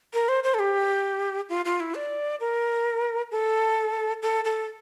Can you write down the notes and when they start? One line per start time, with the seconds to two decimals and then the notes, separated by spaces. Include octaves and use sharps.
0.14 A#4
0.29 C5
0.44 C5
0.54 A4
0.59 G4
1.49 F4
1.65 F4
1.80 E4
1.95 D5
2.40 A#4
3.31 A4
4.23 A4
4.45 A4